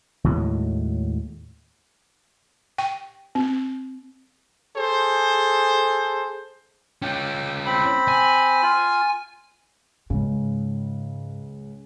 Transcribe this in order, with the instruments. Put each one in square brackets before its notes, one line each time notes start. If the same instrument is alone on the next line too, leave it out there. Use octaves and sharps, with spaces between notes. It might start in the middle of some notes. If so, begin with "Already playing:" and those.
[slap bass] D#2 A2 F#3 G#3
[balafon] G5
C4
[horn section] G#4 A4 C5
[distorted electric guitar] C#4 F4 [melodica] G5
[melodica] C4 B5
[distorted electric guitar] G#5
[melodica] F4
[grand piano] C#2 C#3 [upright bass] G#2